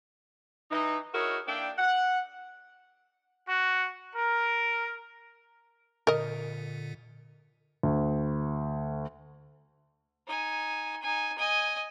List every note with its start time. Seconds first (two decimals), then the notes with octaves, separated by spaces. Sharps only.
0.72 E3 D#4
1.14 E4 F#4 G#4 A#4 C#5 D#5
1.47 A#3 D4 E4 D5 G5
1.78 F#5
3.48 F#4
4.15 A#4
6.07 A#2 D3 A#4 D#5
7.83 D2
10.27 D#4 G#5
11.02 D#4 G#5
11.38 D#5 G#5